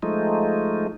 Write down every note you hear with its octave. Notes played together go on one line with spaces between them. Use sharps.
F3 G#3 A3 D#4